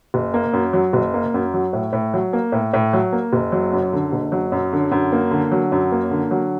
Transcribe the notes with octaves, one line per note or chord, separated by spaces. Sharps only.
F#1
A#3
F#2
F#3
F#1
A#3
F#2
F#3
A2
A2
F#3
A#3
A2
A2
F#3
A#3
F#1
F#3
F#2
D3
F#1
F#3
F#2
D3
F#2
A#3
D3
F#3
F#2
A#3
D3
F#3